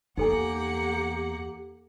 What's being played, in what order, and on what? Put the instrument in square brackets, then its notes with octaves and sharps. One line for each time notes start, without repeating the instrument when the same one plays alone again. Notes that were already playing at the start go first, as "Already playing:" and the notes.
[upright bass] E2 [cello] A#3 F#5 [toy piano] D#4 A4 G#5 [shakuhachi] G4